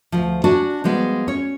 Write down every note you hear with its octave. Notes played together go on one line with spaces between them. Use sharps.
D2 F3
D4 F#4 D5 G#5 A5
F3 G3 G#3 B3
C#4 C#5